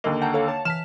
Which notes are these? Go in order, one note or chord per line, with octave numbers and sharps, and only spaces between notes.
D#2 D3 A#3 D#5
F#5 G5 A5 A#5
A4 C#5 F5
C#5 A5
E3 A5 F6 B6 E7